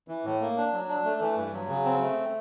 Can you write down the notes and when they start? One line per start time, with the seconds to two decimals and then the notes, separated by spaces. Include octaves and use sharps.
0.08 E3
0.24 A2
0.41 A#3
0.57 D4
0.72 F#3
0.88 D4
1.05 A3
1.21 E3
1.37 G2
1.54 F#3
1.69 C#3
1.85 C4
2.02 A3